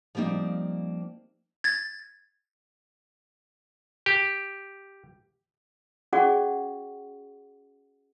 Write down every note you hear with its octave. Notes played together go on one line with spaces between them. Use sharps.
F3 G3 A#3 C4 D#4
G#6 A6
G4
C#4 F#4 G#4 D5 F#5 C#6